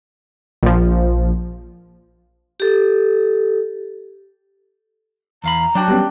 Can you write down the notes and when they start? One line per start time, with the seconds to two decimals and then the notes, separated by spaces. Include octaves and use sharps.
0.63 A#1 F3
2.60 G4 A4
5.44 E2 F5 A#5 B5
5.75 F#3 D4 F#4 G5
5.88 G3 B3 C#4 G4